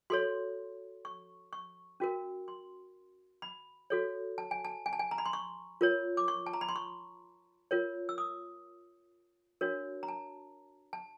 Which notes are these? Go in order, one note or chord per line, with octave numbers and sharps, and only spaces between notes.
F#4 A4 C#5 C6
C#6
C#6
C#4 F#4 A#4
C6
B5
F#4 A4 C#5
A5
G#5
A5
G#5
A5
G#5
A#5
B5
C6
C#6
F4 A#4 C#5
D6
C#6
A5
A#5
B5
C6
C#6
F4 A#4 C#5
E6
D#6
D4 F#4 A#4 C#5
A#5
A5
A5